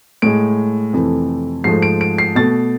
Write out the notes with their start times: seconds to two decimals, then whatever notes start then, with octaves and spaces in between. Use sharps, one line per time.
0.22 A2 G#3 D7
0.93 F2 C3 E3 A3
1.64 G#2 F3 A3 C7
1.82 D7
2.01 D7
2.18 C7
2.35 B2 A3 A6